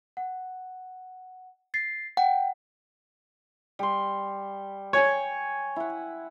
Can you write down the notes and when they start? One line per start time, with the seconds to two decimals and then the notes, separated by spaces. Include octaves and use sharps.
0.17 F#5
1.74 A6 C7
2.17 F#5 G5
3.79 G3 C6
4.93 C#5 G5 G#5 C#6
5.76 E4 F#5